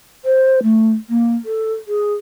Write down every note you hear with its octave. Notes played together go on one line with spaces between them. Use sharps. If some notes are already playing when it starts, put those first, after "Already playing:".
C5
A3
A#3
A4
G#4